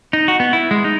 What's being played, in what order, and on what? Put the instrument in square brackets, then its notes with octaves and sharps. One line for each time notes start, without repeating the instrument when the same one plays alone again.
[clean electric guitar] D#4
F#4
B3
E4
G#3
D#4